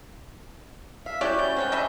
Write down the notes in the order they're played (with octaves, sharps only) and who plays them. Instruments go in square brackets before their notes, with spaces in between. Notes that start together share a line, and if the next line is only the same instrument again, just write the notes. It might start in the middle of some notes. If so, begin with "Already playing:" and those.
[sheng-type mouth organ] E5 [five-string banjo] F5
[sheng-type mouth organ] C#4 G6 [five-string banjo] E4 F#4 E5 [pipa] G4 C#5 D5
[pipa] G3
[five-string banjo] C4 B4 C#5
[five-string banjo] D4 [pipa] D#5 E5 B5